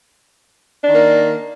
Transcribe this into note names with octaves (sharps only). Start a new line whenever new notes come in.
D#3 A#3 D4